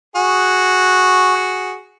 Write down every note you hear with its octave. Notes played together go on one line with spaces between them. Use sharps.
F#4 G#4